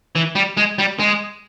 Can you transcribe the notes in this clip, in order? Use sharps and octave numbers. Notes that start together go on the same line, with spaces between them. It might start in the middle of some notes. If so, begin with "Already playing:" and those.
E3
G3
G#3
G3
G#3